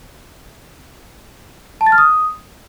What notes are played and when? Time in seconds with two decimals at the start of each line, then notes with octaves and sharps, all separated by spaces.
1.81 A5
1.86 A6
1.92 F6
1.98 D#6